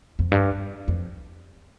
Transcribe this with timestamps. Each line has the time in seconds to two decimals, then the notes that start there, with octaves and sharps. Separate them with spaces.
0.19 F2
0.32 G2
0.88 F2